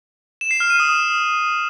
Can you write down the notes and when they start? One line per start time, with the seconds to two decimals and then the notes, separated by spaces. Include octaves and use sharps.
0.41 E7
0.51 C7
0.60 F6
0.70 D#7
0.80 D#6